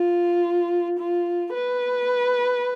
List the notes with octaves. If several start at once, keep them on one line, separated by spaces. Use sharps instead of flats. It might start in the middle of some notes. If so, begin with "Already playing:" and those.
Already playing: F4
F4
B4